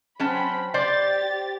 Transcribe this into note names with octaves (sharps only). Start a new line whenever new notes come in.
F#3 C4 C#4 A5 B5
G4 C5 D5 A6